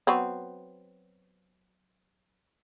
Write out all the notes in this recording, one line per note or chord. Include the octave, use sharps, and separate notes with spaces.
F#3 B3 C4